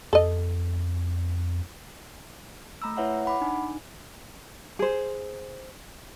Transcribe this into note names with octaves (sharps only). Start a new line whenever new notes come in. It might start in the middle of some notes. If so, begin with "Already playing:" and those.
F2 A4 D#5
A3 A#5 B5 E6
E4 B4 C#5 E5 F#5
F#5 B5 D6
D4 D#4 G#5
G#4 C5